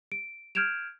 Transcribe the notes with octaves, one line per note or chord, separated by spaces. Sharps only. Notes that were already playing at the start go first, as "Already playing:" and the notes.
D7
F6 G6 G#6 D7 E7 F7